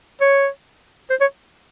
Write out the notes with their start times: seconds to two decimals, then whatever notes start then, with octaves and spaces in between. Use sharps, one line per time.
0.21 C#5
1.10 C5
1.21 C#5